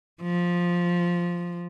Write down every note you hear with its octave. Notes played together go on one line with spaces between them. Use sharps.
F3